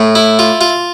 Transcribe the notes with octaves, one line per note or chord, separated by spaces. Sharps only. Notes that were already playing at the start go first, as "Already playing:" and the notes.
Already playing: A2
E4
F4
F4